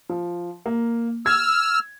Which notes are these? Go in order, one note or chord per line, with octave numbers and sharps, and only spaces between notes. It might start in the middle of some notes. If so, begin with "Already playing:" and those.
F3
A#3
E6 F6 G#6